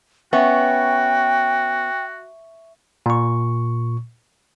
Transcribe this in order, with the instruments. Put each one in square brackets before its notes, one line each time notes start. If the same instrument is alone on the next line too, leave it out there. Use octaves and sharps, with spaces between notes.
[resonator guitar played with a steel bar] B3 C#4 [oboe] F#4 [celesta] E5 C#6 [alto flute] G5
[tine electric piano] A#2 C#6